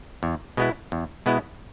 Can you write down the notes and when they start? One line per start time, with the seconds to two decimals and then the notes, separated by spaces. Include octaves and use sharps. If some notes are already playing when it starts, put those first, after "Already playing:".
0.23 E2
0.57 B2 G#3 B3 E4
0.92 E2
1.26 B2 G#3 B3 E4